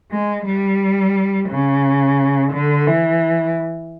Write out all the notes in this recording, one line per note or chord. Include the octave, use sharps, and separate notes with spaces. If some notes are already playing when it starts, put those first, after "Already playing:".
G#3
G3
C#3
D3
E3